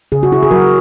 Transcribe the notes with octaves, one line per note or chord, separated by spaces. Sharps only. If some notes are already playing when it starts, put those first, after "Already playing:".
C#3 G#4
F#4
E4 G#4
G#4
F#3 F#4 A#4